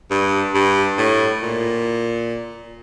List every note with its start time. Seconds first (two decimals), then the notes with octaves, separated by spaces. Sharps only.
0.11 G2
0.54 G2
0.98 A2
1.42 A#2